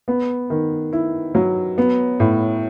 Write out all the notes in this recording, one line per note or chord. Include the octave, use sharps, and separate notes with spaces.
B3
D#3
E4
F#3
B3
A2